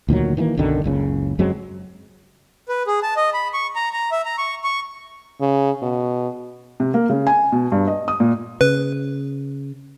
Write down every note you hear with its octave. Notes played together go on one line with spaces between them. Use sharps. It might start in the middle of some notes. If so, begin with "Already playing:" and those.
D2 A#2 D#3 F#3
D#3 E3 G3 A#3
B1 F#2 D3 D#3
F#1 C#2 C#3
F#2 F#3 G#3 C4
B4
G#4
A5
D#5
B5
C#6
A#5
A#5
E5
A#5
C#6
C#6
C#3
B2
C3
A#3
C#3
G#5
B2
G2
D#5
D#6
A#2
C#3 B4